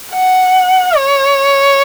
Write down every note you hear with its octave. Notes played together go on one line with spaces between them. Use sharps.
F#5
C#5